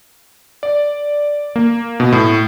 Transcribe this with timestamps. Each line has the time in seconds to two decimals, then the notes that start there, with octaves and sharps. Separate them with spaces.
0.63 D5
1.56 A#3
2.00 B2
2.12 A2